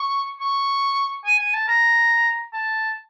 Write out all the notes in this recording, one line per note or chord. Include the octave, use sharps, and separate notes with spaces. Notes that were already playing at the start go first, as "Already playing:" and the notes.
Already playing: C#6
C#6
G#5
G#5
A5
A#5
A5